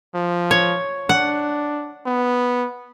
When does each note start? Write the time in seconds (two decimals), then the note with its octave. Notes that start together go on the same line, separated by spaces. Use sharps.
0.15 F3
0.51 C#5
1.09 D4 F#5
2.06 B3